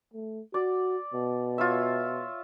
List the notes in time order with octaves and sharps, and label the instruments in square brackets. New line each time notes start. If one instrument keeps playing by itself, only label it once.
[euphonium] A3
[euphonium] F#4 [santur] D5
[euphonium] B2
[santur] F4 C#5 E5